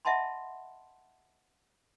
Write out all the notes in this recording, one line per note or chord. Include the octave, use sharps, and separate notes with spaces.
D#5 E5 F#5 A5 B5 C6